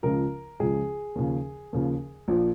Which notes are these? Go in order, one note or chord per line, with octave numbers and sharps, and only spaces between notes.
C#2 C#3 F3 A#4
C#2 C#3 F3 G#4
D#2 C#3 F3
D#2 C#3 F3
A#1 A#2 F3